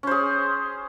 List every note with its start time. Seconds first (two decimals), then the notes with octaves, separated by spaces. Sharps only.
0.03 C#4
0.07 C5
0.11 G#4